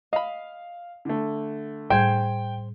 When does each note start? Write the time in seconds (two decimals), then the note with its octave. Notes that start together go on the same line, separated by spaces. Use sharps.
0.13 D#5 F5 B5
1.05 D3 A3
1.90 A2 G3 C5 G5 G#5 G6